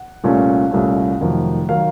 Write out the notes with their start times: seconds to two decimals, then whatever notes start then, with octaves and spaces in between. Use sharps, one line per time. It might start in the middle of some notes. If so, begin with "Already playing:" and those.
Already playing: F#5
0.24 C2 A#2 A3 C#4
0.71 C2 A#2 A3 C#4
1.21 F1 F2 D#3 F#3
1.69 D#3 F#3 F5